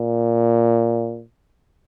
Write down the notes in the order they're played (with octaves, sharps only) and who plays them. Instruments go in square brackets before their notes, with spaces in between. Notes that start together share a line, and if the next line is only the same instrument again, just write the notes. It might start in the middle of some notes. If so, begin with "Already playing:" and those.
Already playing: [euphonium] A#2